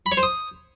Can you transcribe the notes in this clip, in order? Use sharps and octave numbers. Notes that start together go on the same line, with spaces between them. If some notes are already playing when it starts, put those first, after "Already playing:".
B5
C#5
C5
D#6